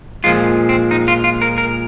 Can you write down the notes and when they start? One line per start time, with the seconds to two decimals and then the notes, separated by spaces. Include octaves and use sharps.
0.24 A#2 F3 G#3 F4
0.69 C4
0.91 D#4
1.08 F4
1.24 F4
1.42 A#4
1.58 A#4